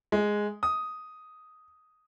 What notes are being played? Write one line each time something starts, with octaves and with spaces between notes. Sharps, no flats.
G#3
D#6